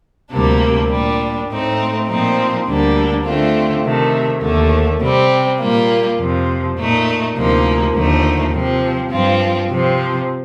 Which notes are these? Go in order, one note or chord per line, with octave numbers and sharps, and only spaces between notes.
D2 C3 G3 A#3 D4
A#2 G3 D4
A2 A3 C4 D#4
A#2 F3 C4 D#4
D2 D3 G3 A#3 D4
D3 A3 C4 F4
C3 D#3 A3
D#2 D3 A3
C3 G3 C4
A#2 G3 A#3 F4
F2 C3 F3
A#2 A3 D#4
D2 C3 F3 A#3 D#4
D#2 D3 F3 A3 D#4
C3 F3 C4
G2 F3 C4 F4
C3 F3 C4